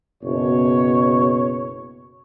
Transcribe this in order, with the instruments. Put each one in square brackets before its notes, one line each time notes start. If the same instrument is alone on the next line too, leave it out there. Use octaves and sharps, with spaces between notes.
[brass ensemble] F#1 B2 C#5